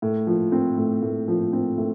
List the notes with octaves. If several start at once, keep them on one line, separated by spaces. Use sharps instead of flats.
A2
F3
C4
A2
A2
F3
C4
A2